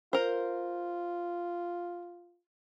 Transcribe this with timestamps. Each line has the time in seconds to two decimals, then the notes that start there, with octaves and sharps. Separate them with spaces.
0.13 F4 A#4 C5